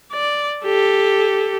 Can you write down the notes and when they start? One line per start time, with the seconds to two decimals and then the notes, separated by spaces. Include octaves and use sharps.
0.12 D5
0.65 G4 A4